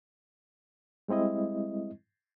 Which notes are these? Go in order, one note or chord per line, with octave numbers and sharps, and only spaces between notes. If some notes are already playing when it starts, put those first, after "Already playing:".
G3 G#3 C4 E4 D#5